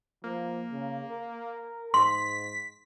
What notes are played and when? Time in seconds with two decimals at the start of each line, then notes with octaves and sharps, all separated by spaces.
0.24 F3 A#3
0.72 C#3
1.10 A#4
1.94 G#2 C6 B6